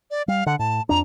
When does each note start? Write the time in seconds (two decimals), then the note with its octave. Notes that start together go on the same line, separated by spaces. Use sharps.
0.11 D5
0.28 G3 F5
0.46 D3 F#5
0.59 A2 A5
0.89 F2 D4 A#5